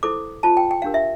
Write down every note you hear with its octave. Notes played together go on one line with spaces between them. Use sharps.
E4 A4 C5 D6
F4 C5 A5
G5
G5
D4 G4 A#4 F5
E5